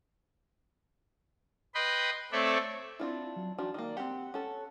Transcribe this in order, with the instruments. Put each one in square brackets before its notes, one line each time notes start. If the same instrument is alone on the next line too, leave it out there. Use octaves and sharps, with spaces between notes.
[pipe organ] B4 D#5 G5 B5 C6
A3 C4 A4 C#5 D5 E5
[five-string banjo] C4 D4 F4 [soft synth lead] E4
[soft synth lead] F#3
[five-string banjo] D#3 F3 D4 [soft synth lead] F#4
[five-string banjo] D#3 A#3 [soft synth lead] D5
[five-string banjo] C4 G4 [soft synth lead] F#5
[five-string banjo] C#4 A4